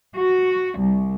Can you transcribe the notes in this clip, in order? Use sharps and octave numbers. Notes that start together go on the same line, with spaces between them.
F#4
C2